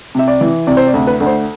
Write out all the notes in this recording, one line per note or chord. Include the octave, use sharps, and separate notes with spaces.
C3 E5
D5
E3
C3 D5
C5
D5
D2
B4
D2
C5